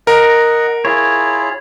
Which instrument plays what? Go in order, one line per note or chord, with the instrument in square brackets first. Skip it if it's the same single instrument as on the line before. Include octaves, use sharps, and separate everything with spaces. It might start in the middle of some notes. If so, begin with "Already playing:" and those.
[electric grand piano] A#4 [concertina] D#5 F#5
[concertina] E4 F4 G#4 [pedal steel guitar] C#5